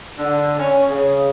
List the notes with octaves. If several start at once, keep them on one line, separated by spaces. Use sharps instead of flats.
D3
C#4
C#3